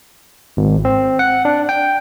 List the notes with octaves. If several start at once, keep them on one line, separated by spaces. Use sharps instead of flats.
G#1
C4
F#5
D4
G5